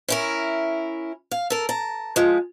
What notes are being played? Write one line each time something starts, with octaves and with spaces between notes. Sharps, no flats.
C#4 E4 A#4
F5
A4 A#4
A5 A#5
F3 G#3